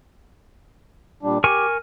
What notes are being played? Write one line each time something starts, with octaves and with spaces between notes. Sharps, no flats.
A#2 G3 D4
G4 A#4 G#5 C#6